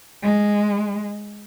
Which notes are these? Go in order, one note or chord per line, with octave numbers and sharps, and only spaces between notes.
G#3